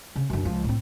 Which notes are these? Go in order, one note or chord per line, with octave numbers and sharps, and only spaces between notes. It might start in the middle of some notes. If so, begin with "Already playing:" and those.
C#3
F#2 D3
C#2 F3
A2 C4